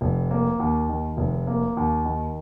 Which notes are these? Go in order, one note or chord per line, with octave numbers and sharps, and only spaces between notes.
F1
A#3
D#2
D#3
F1
A#3
D#2
D#3